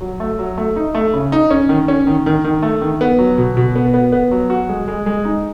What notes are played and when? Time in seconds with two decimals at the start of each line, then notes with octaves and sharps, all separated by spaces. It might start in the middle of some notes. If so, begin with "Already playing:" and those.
0.01 F#3
0.20 A3
0.39 F#3
0.57 A3
0.76 D#4
0.95 A3
1.13 C#3
1.32 D#4
1.50 C#4
1.69 D#3
1.88 C#4
2.07 D#3
2.26 D#3
2.44 D#3
2.63 A3
2.81 D#3
3.01 B3
3.19 F#3
3.38 B2
3.57 B2
3.75 B3
3.94 B3
4.12 B3
4.31 F#3
4.50 F#4
4.69 G#3
4.88 G#3
5.06 G#3
5.25 D#4